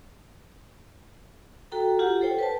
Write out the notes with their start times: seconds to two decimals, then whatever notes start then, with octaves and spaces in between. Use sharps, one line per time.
1.72 F#4 A4 G5 A#5
1.99 F4 G4 F#5
2.21 A4 C5 C#5 G5
2.39 B4 A5